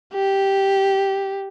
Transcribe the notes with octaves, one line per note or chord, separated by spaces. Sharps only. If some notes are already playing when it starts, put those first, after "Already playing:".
G4